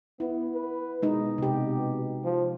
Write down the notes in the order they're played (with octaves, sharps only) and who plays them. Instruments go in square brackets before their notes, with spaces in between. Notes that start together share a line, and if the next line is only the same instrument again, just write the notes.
[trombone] B3 [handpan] E4
[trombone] B4
[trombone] B2 [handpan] G#3 D#4
[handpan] C3 G4
[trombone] F3